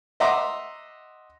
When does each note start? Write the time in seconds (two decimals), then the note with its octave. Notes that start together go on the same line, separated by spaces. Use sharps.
0.20 D#5 E5 F#5 A#5 C6 D6